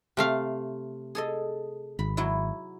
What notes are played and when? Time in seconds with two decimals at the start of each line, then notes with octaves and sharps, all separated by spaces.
0.17 C3 A3 F5
1.15 G#4 A4 D#5
1.99 G#1 B5
2.17 F#3 E4